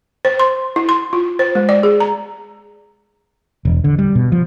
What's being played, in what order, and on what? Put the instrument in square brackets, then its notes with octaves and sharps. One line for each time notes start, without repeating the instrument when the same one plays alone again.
[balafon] C5
C6
E4
C6
F4
C5
G#3
D5
G#4
A#5
[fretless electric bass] E1
D3
G3
B2
F3